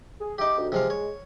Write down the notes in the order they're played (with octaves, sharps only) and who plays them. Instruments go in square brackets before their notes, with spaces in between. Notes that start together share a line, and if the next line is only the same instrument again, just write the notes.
[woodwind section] G#4
[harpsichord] D#4 G4 [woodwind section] E5 D6
[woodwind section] D2
[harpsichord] C3 F3 F5 [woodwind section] G#3
[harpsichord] C#5